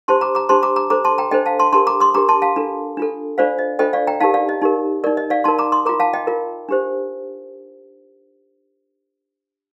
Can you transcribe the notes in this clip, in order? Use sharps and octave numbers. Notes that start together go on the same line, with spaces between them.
D4 G4 C5 A5 C6
A#5 D6
A#5 D6
D4 G4 C5 A5 C6
A#5 D6
A#5 D6
D4 A4 C5 A#5 D6
A5 C6
G5 A#5
D4 A4 C5 D#5 G5
F5 A5
A5 C6
D4 G4 A#4 A5 C6
A#5 D6
C6 D#6
D4 G4 A#4 A#5 D6
A5 C6
F5 A5
D4 F4 A4
D4 F4 A4
D4 F4 A4 C5 D5 F5
D#5
D4 F4 A4 C5 D#5 G5
D5 F5
G5 A#5
D#4 G4 A#4 F5 A5
D5 F5
D#5
D#4 G4 A#4
D#4 A#4 D5
D#5
D5 F5
D#4 A#4 A5 C6
A#5 D6
C6 D#6
F4 A#4 A#5 D6
F5 A5
D#5 G5
F4 A#4
D4 G4 C5